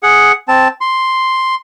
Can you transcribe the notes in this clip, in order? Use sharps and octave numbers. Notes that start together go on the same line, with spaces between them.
G#4 F#5
C4 A5
C6